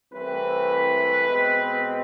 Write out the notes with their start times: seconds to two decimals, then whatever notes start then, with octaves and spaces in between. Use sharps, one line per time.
0.12 C2 C3 E3 A3 C4 B4
1.28 B2 G#3 C4